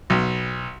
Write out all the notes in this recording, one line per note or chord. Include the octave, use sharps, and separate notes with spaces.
B1